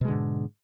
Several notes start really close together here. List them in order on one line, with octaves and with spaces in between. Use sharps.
B2 G#3 D3 G#2